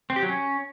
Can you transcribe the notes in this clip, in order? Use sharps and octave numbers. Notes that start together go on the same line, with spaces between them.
C4
G4
F#3
C#4